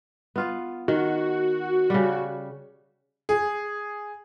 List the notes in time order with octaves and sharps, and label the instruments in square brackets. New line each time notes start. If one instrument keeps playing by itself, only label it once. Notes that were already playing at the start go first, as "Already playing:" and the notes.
[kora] B3 F4 F5
[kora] D#3 [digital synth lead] F#4
[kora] C#3 G3
[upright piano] G#4